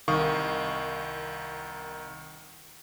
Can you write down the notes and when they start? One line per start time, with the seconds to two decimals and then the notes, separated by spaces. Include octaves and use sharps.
0.08 C2 D#3 F5 C#6 D#6